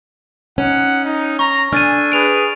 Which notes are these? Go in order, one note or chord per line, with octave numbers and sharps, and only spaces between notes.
C#4 D#4 F#5
D#4
A#5 C#6
D4 A4 G#5 F6 A6 D#7
G#4 B4 D7 F7